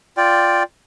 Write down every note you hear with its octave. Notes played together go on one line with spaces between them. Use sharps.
F4 D5 G5